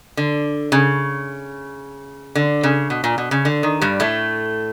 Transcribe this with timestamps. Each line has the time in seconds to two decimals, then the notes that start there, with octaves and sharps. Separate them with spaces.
0.17 D3
0.72 C#3
2.35 D3
2.63 C#3
2.90 B2
3.04 A#2
3.18 B2
3.31 C#3
3.45 D3
3.63 D#3
3.81 G2 G3
4.00 A2 A3